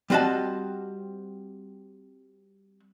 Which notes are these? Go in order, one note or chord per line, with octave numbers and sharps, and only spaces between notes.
G3 C4 F#4 D#5 A5